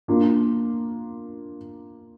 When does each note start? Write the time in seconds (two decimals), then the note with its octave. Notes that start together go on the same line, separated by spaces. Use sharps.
0.08 A#3 D4 F4